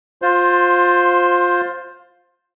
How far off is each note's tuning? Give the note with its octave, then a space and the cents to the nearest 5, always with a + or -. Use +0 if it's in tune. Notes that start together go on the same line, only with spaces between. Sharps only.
F4 +20 C5 +5